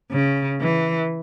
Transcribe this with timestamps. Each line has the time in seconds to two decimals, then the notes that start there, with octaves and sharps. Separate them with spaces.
0.12 C#3
0.61 E3